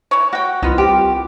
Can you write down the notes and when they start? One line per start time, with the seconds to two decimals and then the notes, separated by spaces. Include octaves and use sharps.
0.11 E3 C#5
0.33 F#4 F#5 G5
0.63 C2 D#3 B3 F4 D#5
0.78 G4